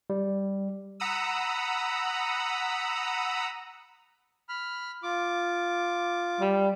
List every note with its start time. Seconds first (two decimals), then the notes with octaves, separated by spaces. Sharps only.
0.10 G3
1.00 F#5 A#5 B5 D#6 E6
4.49 B5 F6
5.03 F4 D6
6.41 G3